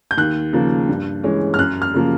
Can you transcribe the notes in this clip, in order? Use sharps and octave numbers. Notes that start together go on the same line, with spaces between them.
G6
D#2 F#6
C#3 F3 A#3
G2
E3 G#3 C#4
F6
F#2 F#6
F6
C#3 F3 A#3